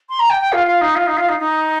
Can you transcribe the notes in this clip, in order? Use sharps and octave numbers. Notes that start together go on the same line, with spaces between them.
C6
A#5
G5
G5
F4
F4
D#4
F4
D#4
F4
D#4
D#4